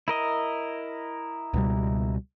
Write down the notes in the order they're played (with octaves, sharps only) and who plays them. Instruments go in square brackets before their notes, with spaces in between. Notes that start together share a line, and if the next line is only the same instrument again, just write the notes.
[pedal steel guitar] E4 A#4 D#5
[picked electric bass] C#2 B2 G3